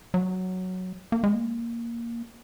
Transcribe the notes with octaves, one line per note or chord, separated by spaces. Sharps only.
F#3
A#3
G#3
A#3